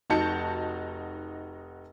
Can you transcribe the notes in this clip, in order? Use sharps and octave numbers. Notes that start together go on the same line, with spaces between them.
F1 D#4 F#4 A5 G6 C#7